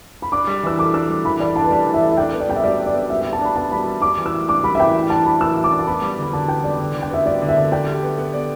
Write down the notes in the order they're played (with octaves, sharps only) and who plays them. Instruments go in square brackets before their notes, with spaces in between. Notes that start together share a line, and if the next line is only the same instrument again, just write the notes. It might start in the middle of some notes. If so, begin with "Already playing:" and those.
[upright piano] B5
[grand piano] D4 [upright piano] D6
[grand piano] G3
[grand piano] E3 [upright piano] E6
[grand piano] A4 [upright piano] D6
[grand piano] D4 [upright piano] E6
[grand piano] G3
[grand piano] E3 [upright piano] B5
[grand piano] A4 [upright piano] D5
[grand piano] D4 [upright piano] A5
[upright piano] B4
[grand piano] G3 [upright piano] D5
[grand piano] E3
[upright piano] E5
[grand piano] A4
[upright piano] E5
[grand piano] D4 [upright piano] G5
[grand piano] B3
[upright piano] D5
[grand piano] G3 [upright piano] G5
[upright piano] E5
[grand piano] G3 [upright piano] D5
[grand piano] D4
[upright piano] D5
[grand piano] B3
[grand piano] G3 [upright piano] E5
[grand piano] G3 [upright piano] E5
[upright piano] A5
[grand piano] D4 [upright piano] B5
[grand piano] B3 [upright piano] A5
[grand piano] G3 [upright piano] B5
[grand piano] G3
[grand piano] G3 [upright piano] D6
[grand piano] E3
[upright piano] E6
[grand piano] A2
[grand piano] D4 [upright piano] D6
[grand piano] G3 [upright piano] B5
[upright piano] E5
[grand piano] E3 [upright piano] G5
[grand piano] A2
[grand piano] D4 [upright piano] A5
[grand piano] G3 [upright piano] B5
[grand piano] E3 [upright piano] E6
[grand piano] A2
[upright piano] D6
[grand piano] D4
[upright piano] A5
[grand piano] B3 [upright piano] B5
[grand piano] G3
[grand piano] D3 [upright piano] B5
[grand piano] D3 [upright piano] A5
[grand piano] B3 [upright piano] G5
[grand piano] G3 [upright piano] D5
[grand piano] D3
D3
[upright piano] G5
[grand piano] B3 [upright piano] E5
[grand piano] G3 [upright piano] D5
[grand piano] D3
[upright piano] E5
[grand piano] D3
[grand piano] D5 [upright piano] G5
[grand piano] G4
B3
B3
D5